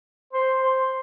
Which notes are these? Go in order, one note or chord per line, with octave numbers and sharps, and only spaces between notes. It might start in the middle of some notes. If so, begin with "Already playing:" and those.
C5
C5